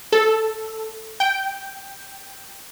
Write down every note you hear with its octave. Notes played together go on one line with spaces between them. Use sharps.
A4
G5